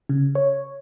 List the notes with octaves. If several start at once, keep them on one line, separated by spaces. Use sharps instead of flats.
C#3
C#5